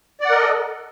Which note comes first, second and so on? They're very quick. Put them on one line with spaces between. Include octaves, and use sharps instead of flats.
D5 F#5 A#4 D#5 A4